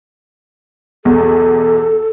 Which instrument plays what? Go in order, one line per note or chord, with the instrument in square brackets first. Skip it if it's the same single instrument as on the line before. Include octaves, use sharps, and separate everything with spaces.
[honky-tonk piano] B1 E2 [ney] A4